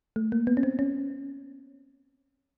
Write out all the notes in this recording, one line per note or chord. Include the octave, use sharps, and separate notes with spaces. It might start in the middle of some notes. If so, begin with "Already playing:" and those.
A3
A#3
B3
C#4
C4
C#4